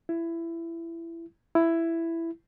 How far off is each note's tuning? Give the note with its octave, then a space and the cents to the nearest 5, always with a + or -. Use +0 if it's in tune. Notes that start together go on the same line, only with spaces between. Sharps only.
E4 +20
E4 +10